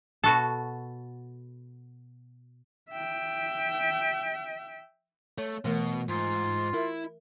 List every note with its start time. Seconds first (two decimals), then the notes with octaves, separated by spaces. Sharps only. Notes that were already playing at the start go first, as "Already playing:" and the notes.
0.24 B2 F#4 A4
2.91 E5 G5
5.38 A3 C#5
5.65 B2 E3 A3 A#4
6.09 G#2 F4
6.74 E4 A#4 E5